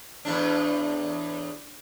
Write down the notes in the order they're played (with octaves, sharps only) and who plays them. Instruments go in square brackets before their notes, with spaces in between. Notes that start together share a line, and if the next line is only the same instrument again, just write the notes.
[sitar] E2 A2 D4